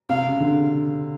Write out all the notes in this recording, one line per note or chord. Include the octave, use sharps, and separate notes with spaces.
C3 F5
C#3
D3